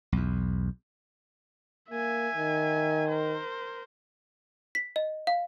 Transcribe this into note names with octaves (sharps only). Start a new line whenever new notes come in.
B1 E2
A#3 E5 G#5
D#3
A#4 C5
B6
D#5
F5